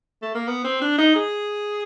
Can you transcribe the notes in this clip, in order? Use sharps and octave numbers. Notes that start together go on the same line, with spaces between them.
A3
A#3
B3
C4
D4
D#4
G#4